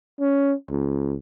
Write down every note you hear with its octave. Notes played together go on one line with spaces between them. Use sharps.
C#4
C#2